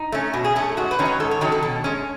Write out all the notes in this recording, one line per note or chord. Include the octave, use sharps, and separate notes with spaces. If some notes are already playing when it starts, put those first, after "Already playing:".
Already playing: D#4
A3 C#4
B2 F#4
G#4
A3 C#4 A4
G#2 F#4
B4
D#3 F#3 C#4
C#5
G#2 A4
C#5
D#3 F#3 C#4 A4
A4
B2
G#3 C#4